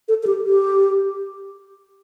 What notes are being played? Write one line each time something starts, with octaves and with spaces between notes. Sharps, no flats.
A4
A4
G4
G4